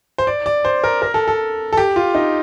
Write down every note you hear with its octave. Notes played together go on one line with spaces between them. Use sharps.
C5
D5
D5
C5
A#4
A#4
A4
A4
A4
G4
F4
D#4